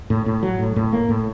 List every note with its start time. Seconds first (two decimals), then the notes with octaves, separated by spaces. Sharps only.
0.10 A2
0.26 A2
0.43 F#3
0.59 A2
0.76 A2
0.93 A#3
1.09 A2